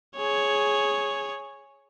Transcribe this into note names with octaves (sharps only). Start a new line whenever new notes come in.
G#4 C#5